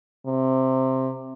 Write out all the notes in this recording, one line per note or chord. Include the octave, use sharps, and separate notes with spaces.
C3